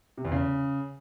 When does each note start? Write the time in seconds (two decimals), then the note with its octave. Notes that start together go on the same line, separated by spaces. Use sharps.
0.18 C3
0.25 E2
0.32 C#3